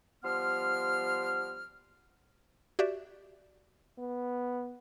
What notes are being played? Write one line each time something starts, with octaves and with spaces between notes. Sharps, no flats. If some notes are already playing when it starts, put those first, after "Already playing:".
F3 G3 B3 C6 F6
F#4 G4 D5 E5
B3